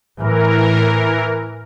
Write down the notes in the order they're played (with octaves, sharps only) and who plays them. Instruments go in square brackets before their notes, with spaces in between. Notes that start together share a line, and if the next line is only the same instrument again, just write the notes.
[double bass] A2 [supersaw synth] E3 A#4